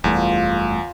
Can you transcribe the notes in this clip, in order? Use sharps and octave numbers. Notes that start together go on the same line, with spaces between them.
F#1 E2 G3 A3 F4